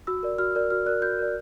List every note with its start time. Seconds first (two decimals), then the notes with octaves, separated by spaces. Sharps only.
0.07 F#4 E6
0.23 A#4 D5
0.38 F#4 F6
0.55 A#4 D5
0.70 F#4 F6
0.86 A#4 D5 F#6
1.02 F#4 G6
1.19 A#4 D5